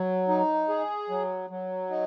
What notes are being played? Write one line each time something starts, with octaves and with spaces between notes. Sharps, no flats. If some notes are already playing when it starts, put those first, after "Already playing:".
Already playing: F#3
D#4
G#4
F#3
F#3
D#4